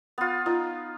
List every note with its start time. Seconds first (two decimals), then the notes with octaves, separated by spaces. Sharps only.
0.18 B3 F4
0.46 D#4 F4